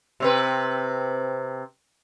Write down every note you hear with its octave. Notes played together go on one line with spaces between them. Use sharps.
C3 C4 B4